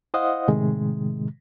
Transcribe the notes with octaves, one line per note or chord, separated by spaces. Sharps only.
E4 C5 D#5 F5 F#5 D#6
A2 C3 D#3 G#3